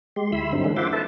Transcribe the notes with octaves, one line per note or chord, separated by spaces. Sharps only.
G#3 G4 C6
D2 E4 B5 C6 E6
G2 D3 F#3 C4 D#4
D#3 E3 G#3 A#3 C#4 D4
F4 C5 E5 F#5 C6 D6
E4 A4 B4 E5 A5